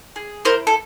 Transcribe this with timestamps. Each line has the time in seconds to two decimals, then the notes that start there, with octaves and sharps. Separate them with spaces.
0.16 G#4
0.45 E4 A#4 C5
0.67 A4